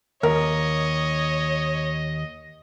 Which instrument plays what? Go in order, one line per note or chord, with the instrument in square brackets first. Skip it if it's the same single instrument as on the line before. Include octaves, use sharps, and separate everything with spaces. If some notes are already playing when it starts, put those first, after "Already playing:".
[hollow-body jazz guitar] D#2 [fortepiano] A#4 [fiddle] C#5 [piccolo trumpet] D#5